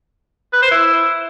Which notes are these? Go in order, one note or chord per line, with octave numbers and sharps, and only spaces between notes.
B4
C5
E4